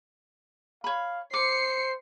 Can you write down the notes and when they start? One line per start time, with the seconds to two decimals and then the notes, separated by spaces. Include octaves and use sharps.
0.84 C#5 F5 B5
1.34 C5 D6 C7 C#7